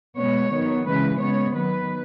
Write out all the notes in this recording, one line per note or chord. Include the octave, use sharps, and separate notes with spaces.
B2 G#3 B3 C#5
D#3 F#3 B3
C#3 E3 G#3 B4
C#3 G#3 B3 C#5
D#3 F#3 B3 B4